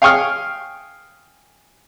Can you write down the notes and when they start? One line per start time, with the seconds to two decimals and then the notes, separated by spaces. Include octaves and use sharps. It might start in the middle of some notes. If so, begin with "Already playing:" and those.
0.02 F5 G5 G#5 C#6 D#6 F6